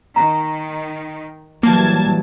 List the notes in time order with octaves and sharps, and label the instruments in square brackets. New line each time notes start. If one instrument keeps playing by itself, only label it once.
[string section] D#3 [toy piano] A#5
[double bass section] E3 F#3 G3 [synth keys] A#3 [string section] A5 G#6